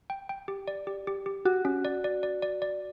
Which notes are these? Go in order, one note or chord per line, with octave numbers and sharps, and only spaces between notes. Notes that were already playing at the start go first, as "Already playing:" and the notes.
G5
G5
G4
D5
G4
G4
G4
F#4 G4
C#4
D5
D5
D5
D5
D5